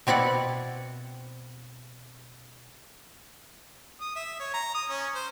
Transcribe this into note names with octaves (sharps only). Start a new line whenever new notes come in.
B2 C4 E4 D5 F#5
D#6
E5
C#5
A#5
D#6
C#4
C5